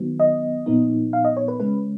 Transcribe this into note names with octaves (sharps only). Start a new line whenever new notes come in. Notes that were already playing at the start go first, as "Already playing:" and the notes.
Already playing: D#3 F#3 B3
D#5
A#2 F3 B3 D#4
F5
D#5
C#5
B4
C#3 G#3 C#4 B4